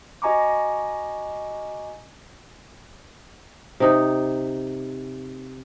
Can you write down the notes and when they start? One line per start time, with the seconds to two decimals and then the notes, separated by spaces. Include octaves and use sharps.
0.22 F#4 D#5 G#5 A#5 C#6 D6
3.80 C3 D#4